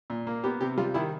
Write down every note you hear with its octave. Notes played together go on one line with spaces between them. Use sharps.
A#2
A#3
B3 G4
C3 G4
G3 F4
D#3 E4